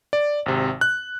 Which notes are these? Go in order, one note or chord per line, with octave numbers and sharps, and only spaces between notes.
D5
G#1 C3
F#6